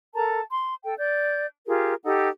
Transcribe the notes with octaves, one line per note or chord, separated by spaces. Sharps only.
A4 A#4 A5 A#5
C6
A4 G5
D5 G6
F4 G4 G#4 A#4
D#4 G4 A4 F#5